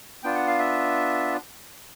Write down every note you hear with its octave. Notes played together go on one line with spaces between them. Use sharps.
B3 D4 F4 G5
F#5
F5
E5